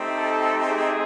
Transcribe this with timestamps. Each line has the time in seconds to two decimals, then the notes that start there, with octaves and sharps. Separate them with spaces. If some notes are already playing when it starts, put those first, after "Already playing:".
Already playing: A3 C4 D#4 G4
0.17 A4
0.65 G#4